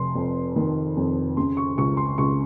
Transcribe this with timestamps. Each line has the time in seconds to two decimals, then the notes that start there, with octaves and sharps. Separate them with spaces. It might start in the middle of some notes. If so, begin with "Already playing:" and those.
Already playing: F1 C6
0.15 F2
0.56 D#3
0.97 F2
1.37 C#3 C6
1.57 C#6
1.77 C#2 C#6
1.97 C6
2.18 C#2 C#6